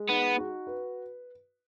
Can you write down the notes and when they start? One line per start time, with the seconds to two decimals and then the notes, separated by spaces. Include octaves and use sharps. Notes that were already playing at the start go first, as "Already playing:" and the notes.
Already playing: G#3
0.09 B3 D#4
0.38 F#4
0.67 B4